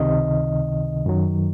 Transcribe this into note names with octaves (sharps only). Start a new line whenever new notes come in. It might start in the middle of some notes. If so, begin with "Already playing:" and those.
Already playing: C#2 C3 D#3 D#5
F#2 D#3 F#3